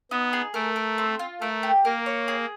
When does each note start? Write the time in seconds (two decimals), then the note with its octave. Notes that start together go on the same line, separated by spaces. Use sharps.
0.11 B3 D#4
0.33 G#4
0.54 A3 A#4
0.76 A#4
0.98 C4
1.19 F4
1.41 A3 A#4
1.63 G4
1.85 A#3 A#4
2.06 C#5
2.28 G#4